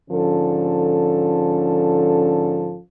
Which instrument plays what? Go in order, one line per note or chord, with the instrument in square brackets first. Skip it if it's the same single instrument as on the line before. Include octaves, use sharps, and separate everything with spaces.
[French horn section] G#2 D3 F3 C#4 A4